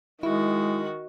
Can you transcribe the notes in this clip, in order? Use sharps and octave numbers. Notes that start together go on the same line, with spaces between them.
D#3 G#3 E4 F#4